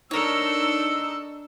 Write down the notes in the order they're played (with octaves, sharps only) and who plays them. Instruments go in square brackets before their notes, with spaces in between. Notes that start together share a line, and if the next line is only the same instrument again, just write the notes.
[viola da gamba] D4 A4 [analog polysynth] D#4 [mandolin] A#4 C#5 [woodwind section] E6